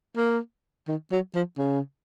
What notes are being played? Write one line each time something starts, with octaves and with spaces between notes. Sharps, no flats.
A#3
D#3
F#3
F3
C#3